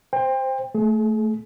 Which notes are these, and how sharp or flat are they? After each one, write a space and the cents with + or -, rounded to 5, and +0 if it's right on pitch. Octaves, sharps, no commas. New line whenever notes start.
C5 +0 G5 +30
A3 +0 G#4 +35